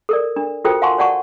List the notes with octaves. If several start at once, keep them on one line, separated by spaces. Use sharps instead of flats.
A4 A#4 D5
D4
F4 F#4 A4 A#4 C5 G5
F5 F#5 G#5 A5 C6 C#6
C#5 D5 F#5 A5 C#6